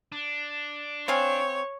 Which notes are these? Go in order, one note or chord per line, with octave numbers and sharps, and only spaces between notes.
D4
C4 C#5 F5 G#5